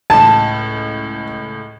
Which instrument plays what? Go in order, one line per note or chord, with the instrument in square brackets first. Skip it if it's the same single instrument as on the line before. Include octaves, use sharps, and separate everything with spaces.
[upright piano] C#2 A2 [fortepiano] A5